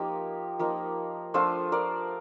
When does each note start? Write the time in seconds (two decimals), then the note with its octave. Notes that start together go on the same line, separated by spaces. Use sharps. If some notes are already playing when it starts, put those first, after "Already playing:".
Already playing: F3 A#3 D#4 G4
0.59 F3 A#3 D#4
1.34 F3 A3 D4 F4 A4 C5
1.72 A#4 D5